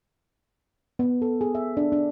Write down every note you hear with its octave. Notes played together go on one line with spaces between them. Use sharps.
B3
A4
G#4
E5
D4
D4